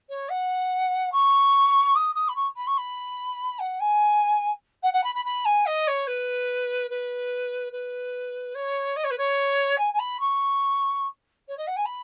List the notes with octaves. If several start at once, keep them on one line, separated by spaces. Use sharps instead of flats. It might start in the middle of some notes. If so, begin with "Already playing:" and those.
C#5
F#5
C#6
D#6
D#6
B5
C#6
B5
C#6
B5
F#5
G#5
F#5
F#5
B5
B5
B5
G#5
D#5
C#5
B4
B4
B4
C#5
D#5
C#5
B4
C#5
G#5
G#5
B5
C#6
C#5
D#5
F#5
G#5
B5